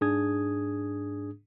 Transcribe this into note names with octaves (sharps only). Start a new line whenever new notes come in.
G#2 D4 G#4 D#6 G#6